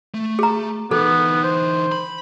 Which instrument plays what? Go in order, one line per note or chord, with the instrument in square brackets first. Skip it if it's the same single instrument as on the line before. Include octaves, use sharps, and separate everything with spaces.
[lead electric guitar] A3
[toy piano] G#4 A#5
[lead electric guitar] E3 D#4 [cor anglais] B3 [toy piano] A4
[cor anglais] C5
[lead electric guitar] B5